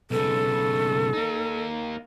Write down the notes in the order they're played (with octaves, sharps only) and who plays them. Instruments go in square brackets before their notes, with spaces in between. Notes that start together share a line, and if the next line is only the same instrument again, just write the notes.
[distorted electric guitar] B1 C#3 [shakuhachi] A4
[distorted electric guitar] A#3 D#4